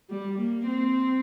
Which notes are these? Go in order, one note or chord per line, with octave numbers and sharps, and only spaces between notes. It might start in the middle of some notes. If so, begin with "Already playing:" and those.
G3
A#3
C4